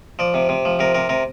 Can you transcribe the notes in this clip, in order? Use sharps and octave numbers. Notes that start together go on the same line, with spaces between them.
F3 D5
C3
C3
F3
C3 A#4
C3 A#4
C3 A#4